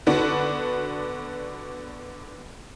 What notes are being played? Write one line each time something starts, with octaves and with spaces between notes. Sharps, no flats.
D3 B3 D4 F#4